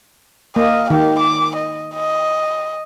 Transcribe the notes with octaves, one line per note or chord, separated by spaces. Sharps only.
A#3 D#5
D#3 G4
D6
D#5
D#5